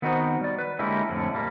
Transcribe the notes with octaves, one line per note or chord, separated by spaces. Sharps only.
D#3 B3 C4 D#4 F#4 C5
G3 D5
B4
D3 G#3 A#3 C#4 E4 G4
F2 A2 D3 C#4
A#2 G3 A#3